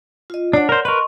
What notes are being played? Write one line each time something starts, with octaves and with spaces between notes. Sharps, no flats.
F4 D#5
D4 C#5 D5 F#5
A#4 C5
A#4 B4 D#5 C6 C#6